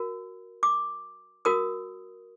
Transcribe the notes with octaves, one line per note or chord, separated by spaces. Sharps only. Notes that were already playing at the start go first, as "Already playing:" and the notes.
Already playing: F#4 A#4
D6
F#4 A#4 D#6